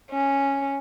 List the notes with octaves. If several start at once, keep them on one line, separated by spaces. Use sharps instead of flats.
C#4